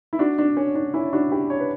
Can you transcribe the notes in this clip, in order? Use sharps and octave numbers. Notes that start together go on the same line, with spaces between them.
E4
D4 F#4
D4
C#4
D4
C#4 E4
D4 F#4
E4 G4
C#5
B4